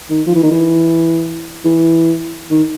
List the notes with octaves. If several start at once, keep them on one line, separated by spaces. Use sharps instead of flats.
D#3
F3
E3
D#3
E3
E3
D#3